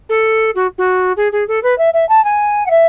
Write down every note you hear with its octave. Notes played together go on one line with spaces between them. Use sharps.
A4
F#4
F#4
G#4
G#4
A4
B4
E5
E5
A5
G#5
F#5
E5